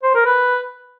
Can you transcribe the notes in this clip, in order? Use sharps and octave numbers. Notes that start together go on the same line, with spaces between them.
C5
A#4
B4